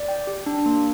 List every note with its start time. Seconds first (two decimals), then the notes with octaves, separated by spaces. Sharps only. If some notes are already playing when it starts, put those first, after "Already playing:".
Already playing: D5
0.08 G5
0.27 G4
0.46 D4
0.66 A#3